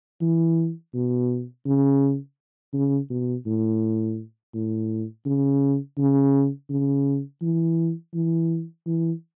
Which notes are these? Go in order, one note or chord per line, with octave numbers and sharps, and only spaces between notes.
E3
B2
C#3
C#3
B2
A2
A2
C#3
C#3
C#3
E3
E3
E3